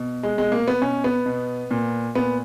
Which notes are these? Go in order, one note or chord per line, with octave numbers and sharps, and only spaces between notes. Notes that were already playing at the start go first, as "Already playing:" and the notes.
Already playing: B2
G#3
B2 G#3
A#3
B3
B2 C#4
B3
B2
A#2
A#2 B3